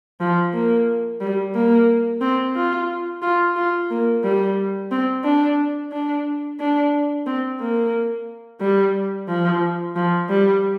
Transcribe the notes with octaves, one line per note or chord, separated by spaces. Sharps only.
F3
A#3
G3
A#3
C4
F4
F4
F4
A#3
G3
C4
D4
D4
D4
C4
A#3
G3
F3
F3
G3